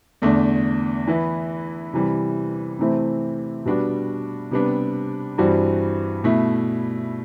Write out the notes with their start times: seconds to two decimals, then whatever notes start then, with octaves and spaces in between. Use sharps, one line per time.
0.22 E2 D3 A3 D4
1.07 E3 B3 E4
1.93 C3 E3 G3
2.79 C3 E3 A3 C4 E4
3.65 B2 G3 B3 D4 F#4
4.51 C3 G3 B3 D4
5.38 G2 E3 G3 C4 F#4
6.24 B2 A3 E4